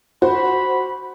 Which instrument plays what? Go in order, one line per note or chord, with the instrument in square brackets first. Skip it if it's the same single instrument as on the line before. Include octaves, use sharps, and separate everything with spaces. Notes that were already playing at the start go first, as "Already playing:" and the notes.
[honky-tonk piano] F#4 C5 [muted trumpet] B5